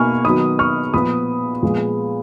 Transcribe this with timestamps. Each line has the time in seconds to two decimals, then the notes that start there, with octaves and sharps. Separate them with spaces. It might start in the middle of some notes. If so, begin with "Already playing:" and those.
Already playing: B2 A#3 D#4 G#5 B5 C#6 F6
0.24 D#3 F#3 B3 B5 D#6
0.59 C#6 F6
0.94 A#2 F3 B3 B5 D#6
1.63 A#2 F3 G#3 B3